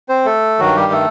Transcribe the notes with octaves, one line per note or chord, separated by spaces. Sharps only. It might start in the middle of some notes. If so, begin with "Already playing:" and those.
C4 C5
A3 A4
G2 D#3 F#3 F#4
G3 G4
A3 A4